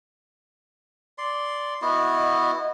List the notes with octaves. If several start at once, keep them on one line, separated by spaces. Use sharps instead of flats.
D5 C6
B3 E4 F#4 D#5